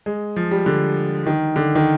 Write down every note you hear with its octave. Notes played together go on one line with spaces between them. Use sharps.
G#3
F3
G3
D3
D#3
D3
D#3